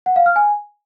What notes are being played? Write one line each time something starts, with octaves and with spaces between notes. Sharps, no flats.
F#5
F5
F6
G#5